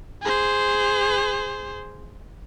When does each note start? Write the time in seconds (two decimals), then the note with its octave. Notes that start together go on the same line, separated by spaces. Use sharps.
0.22 G#4 C5